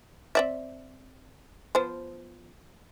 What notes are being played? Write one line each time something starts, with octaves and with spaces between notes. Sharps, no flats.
C4 D5 E5
F3 B3 C5